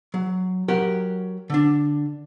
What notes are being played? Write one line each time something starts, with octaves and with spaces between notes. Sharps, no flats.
F#3
F#3 G4 A#4 F#5
D3 D4